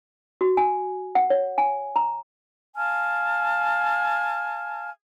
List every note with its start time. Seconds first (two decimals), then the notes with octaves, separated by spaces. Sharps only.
0.41 F#4
0.57 G#5
1.15 F#5
1.30 C#5
1.58 G#5
1.96 A#5
2.76 F5 G#5 A5 F6